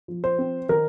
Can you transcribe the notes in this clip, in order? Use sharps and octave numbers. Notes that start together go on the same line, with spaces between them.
F3
C5
C4
D#3 A#4